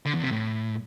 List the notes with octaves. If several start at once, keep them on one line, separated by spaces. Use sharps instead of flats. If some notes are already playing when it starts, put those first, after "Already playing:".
D3
E2
C3
A2